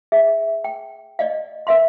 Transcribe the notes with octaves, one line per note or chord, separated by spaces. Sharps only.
G#4 E5
G5
D5 D#5 F5
A#4 E5 F5 C6